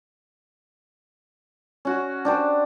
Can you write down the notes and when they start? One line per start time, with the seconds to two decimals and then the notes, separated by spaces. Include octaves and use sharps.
1.85 C#4 F#4
2.25 D4 G4 C5